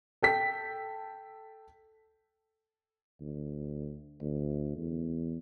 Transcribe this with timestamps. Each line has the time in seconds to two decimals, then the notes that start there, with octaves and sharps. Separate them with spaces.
0.22 A4 G5 B6
3.21 D2
4.21 D2
4.77 E2